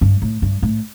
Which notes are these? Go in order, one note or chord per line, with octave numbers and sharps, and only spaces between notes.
G2
A2
G2
A2